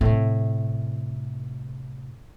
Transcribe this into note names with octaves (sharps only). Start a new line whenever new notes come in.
A2 C3